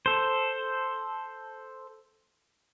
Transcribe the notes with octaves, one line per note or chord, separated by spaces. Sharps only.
A4 C5